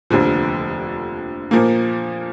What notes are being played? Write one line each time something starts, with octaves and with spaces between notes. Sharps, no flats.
F1 D#2 D3 F3
A#2 F3 A#3